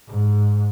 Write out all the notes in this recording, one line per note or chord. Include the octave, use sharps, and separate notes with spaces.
G#2